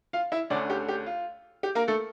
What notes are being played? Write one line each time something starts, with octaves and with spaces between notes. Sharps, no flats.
F4 F5
E4 E5
D2 D3 A3 C#4 D4 D5
G4
G4
F4
G4
A#3 A#4
A3 A4